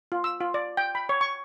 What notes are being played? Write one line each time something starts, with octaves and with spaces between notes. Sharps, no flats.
F4
E6
F4
D5
G5
B5
C#5
C#6